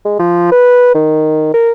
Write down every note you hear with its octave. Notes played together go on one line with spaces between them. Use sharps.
G#3
F3
B4
D#3
A#4